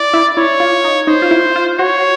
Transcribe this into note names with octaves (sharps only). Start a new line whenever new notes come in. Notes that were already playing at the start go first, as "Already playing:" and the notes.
Already playing: E4 D5
E4
E4 C#5
F4
D#4
D#4 C5
F4
E4
F4
F#4 C#5